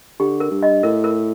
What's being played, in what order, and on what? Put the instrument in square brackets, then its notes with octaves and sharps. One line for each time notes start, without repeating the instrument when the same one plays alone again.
[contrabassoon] D3 [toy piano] G4
[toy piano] A#4
[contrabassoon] G2
[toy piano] D#5
[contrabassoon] A2 [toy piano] A#4
[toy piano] A#4